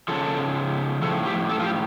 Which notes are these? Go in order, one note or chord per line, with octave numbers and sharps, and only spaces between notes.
C#3 F3 A4
A2 F3 A4
G4
A4
F4
G4